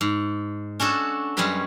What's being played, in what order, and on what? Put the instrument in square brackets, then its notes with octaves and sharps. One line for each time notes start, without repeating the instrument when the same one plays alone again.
[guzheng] G#2
C#4 D4 F#4 A4
F#2 G3 G#3 C#4 B4 B5